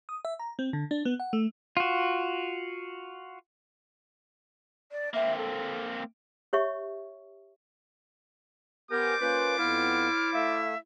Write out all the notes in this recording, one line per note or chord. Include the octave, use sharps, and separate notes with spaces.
D#6
E5
A#5
C4
D3
D4
B3
F#5
A3
F4 F#4
D5
A#3 C4 E5
A4
G4 C#5 E5 C#6
B3 G4 A#4 C5 D5 G#5 D6 G6
A#3 C#4 F4 B4
F2 B3 E4 F5 F6
A3 E5 F5